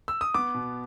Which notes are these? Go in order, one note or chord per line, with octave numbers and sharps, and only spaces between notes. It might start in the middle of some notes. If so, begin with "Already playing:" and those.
E6
D#6
B3 D6
B2